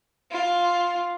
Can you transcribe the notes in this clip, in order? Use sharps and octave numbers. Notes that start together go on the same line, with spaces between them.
F4